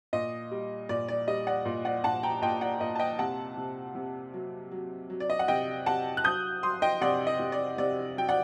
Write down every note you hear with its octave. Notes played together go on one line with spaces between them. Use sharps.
A#2 D#5
G3
A#2 D5
D5
G3 D#5
D5 F#5
A#2
D5 F#5
A#2 F#5 A5
G5 A#5
A#2 D#5 G5
D5 F#5
A#2 D#5
A5
D#5 G5
C3 F#5 A5
C3
C3
F#3
F#3
F#3
D5
D#5
F#5
C3 D#5 G5
C3 F#5 A5
F#6
F#3 D#6 G6
F#3 C6 D#6
D#5 G5
C3 D5 F#5
D#5
C3
D5
C3 D5
F#3 G5
D5 F#5